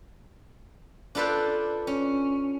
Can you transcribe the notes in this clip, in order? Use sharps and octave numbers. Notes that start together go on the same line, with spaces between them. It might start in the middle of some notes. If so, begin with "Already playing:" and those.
D4 F4 A4 B4 C5 D5
C#4